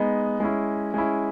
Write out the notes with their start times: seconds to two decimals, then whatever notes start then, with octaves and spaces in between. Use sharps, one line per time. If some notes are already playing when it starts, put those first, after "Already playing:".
Already playing: G#3 B3 D#4
0.40 G#3 C#4 E4
0.94 G#3 C#4 E4